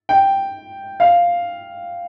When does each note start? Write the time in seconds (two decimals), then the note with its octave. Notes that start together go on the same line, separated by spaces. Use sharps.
0.09 G5
1.00 F5